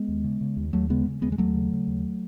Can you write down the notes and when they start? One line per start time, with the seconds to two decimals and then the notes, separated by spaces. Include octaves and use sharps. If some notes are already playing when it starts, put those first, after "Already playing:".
Already playing: G#3 B3
0.08 D#2
0.24 C#3
0.41 C#3
0.57 D#2
0.73 D#2 F#3 A3
0.90 C#3 G#3 B3
1.07 C#3
1.22 D#2 G#3 B3
1.32 G#3
1.38 D#2 F#3 A3
1.55 C#3
1.72 C#3
1.88 D#2